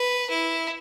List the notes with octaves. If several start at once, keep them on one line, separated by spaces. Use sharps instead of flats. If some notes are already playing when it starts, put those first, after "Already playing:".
Already playing: B4
E4